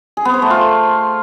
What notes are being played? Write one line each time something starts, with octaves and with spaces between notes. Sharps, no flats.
G#4
B3
C5
A3
F4